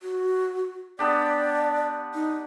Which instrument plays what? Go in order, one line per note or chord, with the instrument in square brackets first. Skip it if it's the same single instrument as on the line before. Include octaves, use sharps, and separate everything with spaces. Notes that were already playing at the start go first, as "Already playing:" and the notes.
[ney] F#4
[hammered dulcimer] B3 D4 G4 [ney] D5
[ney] D#4